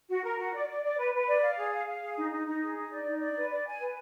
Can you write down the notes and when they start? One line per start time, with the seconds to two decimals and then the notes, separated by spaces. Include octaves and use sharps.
0.09 F#4
0.24 A#4
0.38 F#4
0.54 D5
0.68 D5
0.83 D5
0.97 B4
1.13 B4
1.27 D5
1.42 F5
1.57 G#4
1.73 F5
1.87 F5
2.02 G#4
2.17 D#4
2.31 D#4
2.46 D#4
2.61 G#4
2.76 D#4
2.90 D5
3.06 D#4
3.21 D5
3.36 B4
3.51 D5
3.66 G#5
3.80 B4